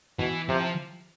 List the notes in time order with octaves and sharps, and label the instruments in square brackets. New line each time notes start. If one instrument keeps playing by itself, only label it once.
[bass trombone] B2 [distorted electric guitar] E3
[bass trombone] C3 [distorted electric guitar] F3